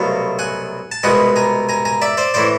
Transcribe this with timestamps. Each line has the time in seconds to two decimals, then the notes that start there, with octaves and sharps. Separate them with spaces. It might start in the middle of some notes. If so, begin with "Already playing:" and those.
Already playing: C2 B2 F#3 A3 F5
0.39 F#5 G#5
0.92 A5
1.03 C2 B2 G#3 B3 F#5 G#5
1.36 G#5 A#5
1.69 G#5 A#5
1.85 G#5 A#5
2.02 D5 E5
2.17 C5 D5
2.34 A2 E3 C5 D5